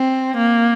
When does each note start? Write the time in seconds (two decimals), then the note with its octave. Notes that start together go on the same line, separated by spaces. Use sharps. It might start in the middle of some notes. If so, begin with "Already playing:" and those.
Already playing: C4
0.37 A#3